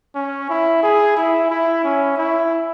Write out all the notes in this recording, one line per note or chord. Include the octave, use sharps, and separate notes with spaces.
C#4
E4
G#4
E4
E4
C#4
E4